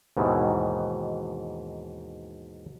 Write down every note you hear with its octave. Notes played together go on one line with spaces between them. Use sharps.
D#2 G#2 B2 D#3 E3